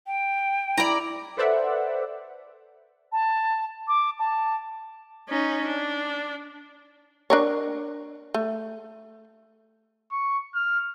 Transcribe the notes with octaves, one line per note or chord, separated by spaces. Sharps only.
G5
E4 D5 A#5 B5
A4 B4 C5 D5 E5 F#5
A5
D6
A5
C#4 D#4
D4
D4 A#4 C#5
A3
C#6
F6